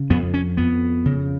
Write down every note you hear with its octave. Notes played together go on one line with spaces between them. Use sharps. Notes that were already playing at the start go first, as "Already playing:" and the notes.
Already playing: C#3
F2 B3
C#4
F2 B3
C#3